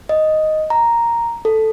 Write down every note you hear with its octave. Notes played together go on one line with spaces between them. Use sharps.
D#5
A#5
A4